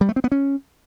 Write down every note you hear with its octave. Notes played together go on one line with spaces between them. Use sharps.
G3
A3
C4
B3
C#4